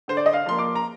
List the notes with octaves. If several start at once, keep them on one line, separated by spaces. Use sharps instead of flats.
D3 C5
D5
D#5
F5
F3 A#3 C6
D6
A#5